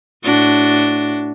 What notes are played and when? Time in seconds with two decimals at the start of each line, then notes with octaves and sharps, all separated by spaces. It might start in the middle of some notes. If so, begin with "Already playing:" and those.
0.24 A2 D4 F#4